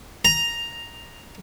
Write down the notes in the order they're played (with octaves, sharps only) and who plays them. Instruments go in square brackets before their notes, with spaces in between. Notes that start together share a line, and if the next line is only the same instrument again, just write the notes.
[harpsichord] A#5